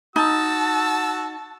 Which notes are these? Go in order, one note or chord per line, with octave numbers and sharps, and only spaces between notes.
D#4 F#4 A5 E6